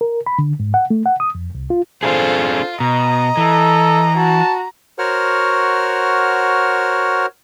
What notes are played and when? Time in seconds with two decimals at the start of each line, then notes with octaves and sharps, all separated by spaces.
0.01 A#4
0.27 B5
0.39 D3
0.60 G#2
0.74 F#5
0.90 A3
1.06 F#5
1.20 D#6
1.35 F2
1.55 C2
1.70 F4
2.03 C4 D4 F4 G#4 A4 C5
2.80 B2 D#5 A#5
3.37 E3 A4
4.17 F#4 A5
4.99 F#4 A#4 C5 C#5 F#5 F6